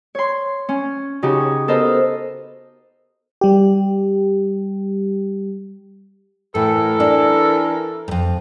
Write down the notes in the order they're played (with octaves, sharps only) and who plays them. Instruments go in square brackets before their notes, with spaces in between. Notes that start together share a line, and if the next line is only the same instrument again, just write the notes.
[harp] C#5 C6
C#4
C#3 D#4 F#4 G4
C#5
B3 A4 A#4 C5 D#5
[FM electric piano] G3 G4
[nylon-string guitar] A2 [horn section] E3 A4 A#4
[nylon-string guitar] D4 D5
F2 G#2